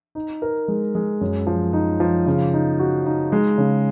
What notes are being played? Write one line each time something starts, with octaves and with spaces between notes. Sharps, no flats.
D#4
A#4
G#3
G#3
F#2
F3
D#4
F3
C#3
D#4
F#4
D#4
G#3
C#3